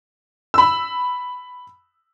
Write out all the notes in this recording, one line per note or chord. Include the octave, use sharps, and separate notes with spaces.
B5 E6